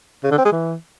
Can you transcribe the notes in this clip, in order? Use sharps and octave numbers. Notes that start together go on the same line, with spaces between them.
C#3
D3
C4
G#3
E3